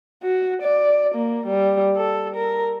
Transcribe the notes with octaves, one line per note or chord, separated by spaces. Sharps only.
F#4
D5
A#3
G3
A4
A#4